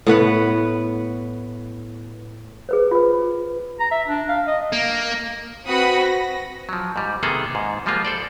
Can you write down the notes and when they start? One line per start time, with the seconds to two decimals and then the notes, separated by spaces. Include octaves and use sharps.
0.07 A2 B3 B4 F#5
2.69 G#4 B4 C5
2.91 F4 B4
3.80 A#5
3.91 E5
4.08 D4
4.29 F5
4.47 D#5
4.72 A#3
5.66 C4 F#4 B4 F#5 B5 D#6
6.03 A#6
6.69 F3 F#3
6.96 G#2 G3
7.23 C3 D#3 A#3 B3 G#4 A4
7.55 G#2
7.86 F3 G3 G#3 A#3 F4
8.05 A4 C5 D5